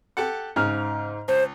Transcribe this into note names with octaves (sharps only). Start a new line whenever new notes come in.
G4 A4 F#5
G#2 C#3 F6
C#2 C5